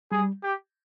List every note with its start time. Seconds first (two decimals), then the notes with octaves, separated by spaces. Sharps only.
0.12 G3 G#4
0.43 G4